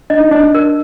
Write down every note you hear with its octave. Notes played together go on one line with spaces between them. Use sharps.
D4 D#5
D#4
D4 D#5
D4
A#4